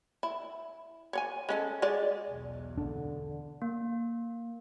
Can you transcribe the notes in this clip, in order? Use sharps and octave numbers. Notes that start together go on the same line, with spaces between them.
E4
C#5 D5 G#5
G#3 C#4 A4
G#3 G#4 D5
B1 E2
D3 D4
A#3